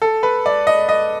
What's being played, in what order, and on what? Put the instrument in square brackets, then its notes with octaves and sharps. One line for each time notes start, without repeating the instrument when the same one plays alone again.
[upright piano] A4
B4
D5
D#5
D#5